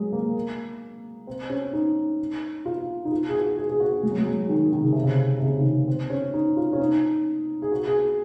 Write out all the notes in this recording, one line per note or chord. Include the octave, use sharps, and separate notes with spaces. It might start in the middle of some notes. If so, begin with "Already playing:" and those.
Already playing: F#3 G#3
A#3
C4
C#4
D#4
F4
D#4
F4
G#4
F#4
G#4
G#4
F#4
G#3
F#3
G#3
F#3
D#3
D#3
C#3
C3
C#3
C3
C#3
D#3
C#3
C4
C#4
D#4
F4
C#4
D#4
G#4
F#4
G#4